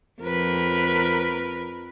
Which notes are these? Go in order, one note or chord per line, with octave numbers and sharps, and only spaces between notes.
F2 A#4 B4